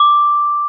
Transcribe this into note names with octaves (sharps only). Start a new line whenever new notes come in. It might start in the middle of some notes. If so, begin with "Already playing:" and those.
Already playing: D6